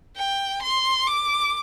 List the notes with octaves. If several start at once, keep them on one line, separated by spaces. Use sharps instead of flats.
G5
C6
D6